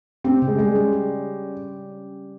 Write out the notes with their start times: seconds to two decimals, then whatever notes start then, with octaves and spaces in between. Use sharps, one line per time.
0.24 C4 G4
0.42 C#3
0.47 G#3
0.58 G3 G#3
0.75 C#4
0.92 G4